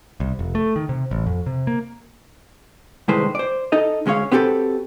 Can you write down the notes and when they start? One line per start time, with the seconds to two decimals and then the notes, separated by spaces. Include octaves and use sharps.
0.20 C2
0.39 F1
0.55 A3
0.76 D#3
0.89 C3
1.11 A1
1.26 F2
1.46 C3
1.67 A#3
3.08 C2 A2 D#3 G#3 B4 C5
3.35 C5 D5
3.72 D#4 A4 D#5
4.06 D2 G#3 C#4 C#5 F5
4.32 B3 C4 F#4 G4 A4 B4